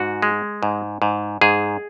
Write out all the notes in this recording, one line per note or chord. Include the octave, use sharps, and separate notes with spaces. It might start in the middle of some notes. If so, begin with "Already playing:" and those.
Already playing: G#2 F#4
G#3
G#2
G#2
G#2 G#4